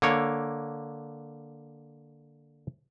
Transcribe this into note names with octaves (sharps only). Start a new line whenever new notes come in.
D3 A#3 C#5